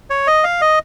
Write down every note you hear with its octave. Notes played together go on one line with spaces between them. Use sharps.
C#5
D#5
F5
D#5